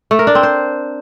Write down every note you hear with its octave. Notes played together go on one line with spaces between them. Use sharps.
A3
A#4
D4
C4
C5